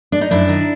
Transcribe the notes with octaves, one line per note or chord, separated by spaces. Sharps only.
D4
D#4
F#2 D4 E4
D#3